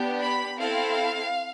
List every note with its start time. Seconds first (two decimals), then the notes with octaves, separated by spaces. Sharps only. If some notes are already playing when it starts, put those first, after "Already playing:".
Already playing: B3 D4 G4
0.21 B5
0.58 C4 E4 A4 F5